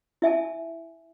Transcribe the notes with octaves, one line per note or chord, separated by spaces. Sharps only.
E4 E5 G#5 A5